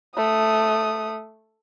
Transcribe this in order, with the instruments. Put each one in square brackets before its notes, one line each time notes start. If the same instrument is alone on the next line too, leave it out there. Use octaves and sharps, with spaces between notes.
[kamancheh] A3 D#6